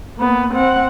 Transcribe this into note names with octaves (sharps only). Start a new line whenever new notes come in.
A#3 B3
C4 F#5